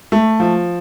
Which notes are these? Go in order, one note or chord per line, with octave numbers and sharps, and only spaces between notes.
A3
F3